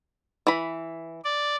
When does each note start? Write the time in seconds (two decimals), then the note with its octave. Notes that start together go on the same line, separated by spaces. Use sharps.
0.47 E3 B5
1.24 D5